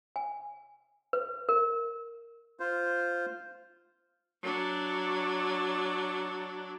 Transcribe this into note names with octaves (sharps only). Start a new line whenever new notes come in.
G#5
B4
A#4
F4 C5
F#3 D4